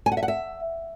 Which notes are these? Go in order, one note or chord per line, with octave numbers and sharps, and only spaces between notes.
G#5
F#5
E5
F#5
E5